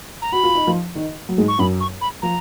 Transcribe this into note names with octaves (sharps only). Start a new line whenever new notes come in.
A#5
F#4 B5
F4
D#4
F3 F4
D#3 D#4
F#3
G#2 G#3
C#6
F#2 F#3 B5
C#6
B5
F3 A#5